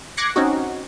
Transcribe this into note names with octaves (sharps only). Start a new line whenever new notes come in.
D6 F#6 G#6 A#6 C7 C#7
C4 C#4 D#4 F#4